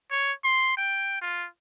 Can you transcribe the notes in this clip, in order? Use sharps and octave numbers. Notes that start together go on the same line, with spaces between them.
C#5
C6
G5
F4